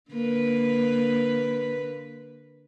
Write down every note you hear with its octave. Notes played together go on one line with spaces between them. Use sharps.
D3 A#3 B4